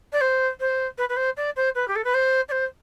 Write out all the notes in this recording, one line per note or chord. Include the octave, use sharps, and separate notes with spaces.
D5
C5
C5
B4
B4
C5
D5
C5
B4
G4
A4
B4
C5
D5
C5